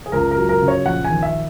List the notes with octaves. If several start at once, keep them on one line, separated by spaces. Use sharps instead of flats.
G#4
C#2 A#4
A#4
F#3
A#4
C#3
C#5
A#1 F#5
G#5
D#3
E5